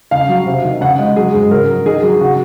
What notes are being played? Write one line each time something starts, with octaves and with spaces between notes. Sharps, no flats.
C#3 F5
F#3
C3
D#3
C#3 F#5
G#3
F#3 G#4
G#2
C#3 A#4
F#3
D#3 G#4
F#3
C#3 F#4